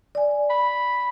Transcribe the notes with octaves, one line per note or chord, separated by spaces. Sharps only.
D5 G#5
B5